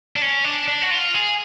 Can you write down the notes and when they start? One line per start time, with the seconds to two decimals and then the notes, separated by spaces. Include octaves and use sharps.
0.16 D4
0.22 C#4
0.44 D4
0.68 D4
0.82 F#4
0.90 F4
1.14 G#4